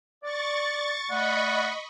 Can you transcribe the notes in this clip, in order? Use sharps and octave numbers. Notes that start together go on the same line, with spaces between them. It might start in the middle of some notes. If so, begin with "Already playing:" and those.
D5 C#6 A6
A3 D5 D#5 F#5 B5 C#6